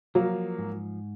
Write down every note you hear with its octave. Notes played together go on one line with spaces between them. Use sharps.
F3 F#3 A#3
G#2